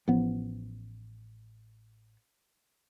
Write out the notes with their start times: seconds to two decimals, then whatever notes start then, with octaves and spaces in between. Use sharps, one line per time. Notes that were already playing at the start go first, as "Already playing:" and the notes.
0.08 A1 F3 B3